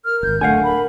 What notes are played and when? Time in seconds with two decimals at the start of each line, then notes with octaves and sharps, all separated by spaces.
0.05 A#4 F6
0.23 D#1 G#1 G6
0.41 D1 D3 A3 F5 F#5 G#5
0.64 A#4 B5